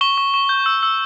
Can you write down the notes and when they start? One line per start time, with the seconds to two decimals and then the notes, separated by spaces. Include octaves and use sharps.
0.01 C#6 G7
0.18 C#6
0.34 C#6
0.49 G6
0.66 E6
0.83 E6